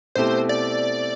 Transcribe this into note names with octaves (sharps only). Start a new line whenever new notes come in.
B2 A3 C4 E4 G4 C5
D5